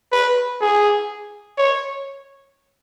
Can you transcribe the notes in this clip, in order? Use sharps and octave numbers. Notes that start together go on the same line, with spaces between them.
B4
G#4
C#5